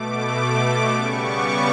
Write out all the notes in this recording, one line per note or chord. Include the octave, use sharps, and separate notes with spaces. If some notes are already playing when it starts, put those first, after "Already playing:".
Already playing: B2 A3 D6
C#3 G3 B3 C#6
D6